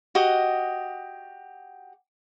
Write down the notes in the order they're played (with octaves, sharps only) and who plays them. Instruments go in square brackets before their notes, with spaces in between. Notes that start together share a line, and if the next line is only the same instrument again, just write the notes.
[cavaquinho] F#4 G4 D#5